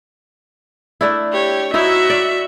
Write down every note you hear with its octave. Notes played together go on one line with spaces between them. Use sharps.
A3 D4 E4
G4 C#5
D#4 E4 F#4 C#5 E5
D5